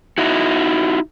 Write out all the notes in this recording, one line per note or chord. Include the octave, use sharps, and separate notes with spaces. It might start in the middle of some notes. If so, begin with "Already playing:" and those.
D#4 E4 F#4